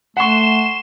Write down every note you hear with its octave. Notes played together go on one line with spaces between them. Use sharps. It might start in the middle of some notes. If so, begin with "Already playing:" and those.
A3 F#5 C6 C#6 E7